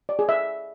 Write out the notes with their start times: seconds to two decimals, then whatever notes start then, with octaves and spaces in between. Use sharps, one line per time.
0.09 D5
0.19 G#4
0.29 E5